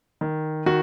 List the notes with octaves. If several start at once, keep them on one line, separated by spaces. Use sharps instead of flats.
D#3
D#3 F#4